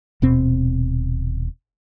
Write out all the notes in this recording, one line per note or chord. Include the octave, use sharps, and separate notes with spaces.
D#1 B2 C4